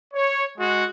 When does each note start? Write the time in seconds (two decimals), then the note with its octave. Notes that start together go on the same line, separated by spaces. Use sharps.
0.14 C#5
0.58 G#3 F#4